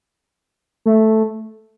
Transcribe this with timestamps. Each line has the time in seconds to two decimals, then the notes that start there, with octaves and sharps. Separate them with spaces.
0.86 A3